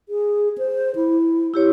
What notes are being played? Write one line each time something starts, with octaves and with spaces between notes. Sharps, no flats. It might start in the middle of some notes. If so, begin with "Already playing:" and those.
G#4
C5
E4
E4 G4 C#5